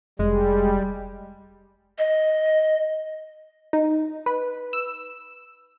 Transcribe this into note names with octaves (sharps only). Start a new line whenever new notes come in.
F1 G3 G#3
D#5
D#4
B4
E6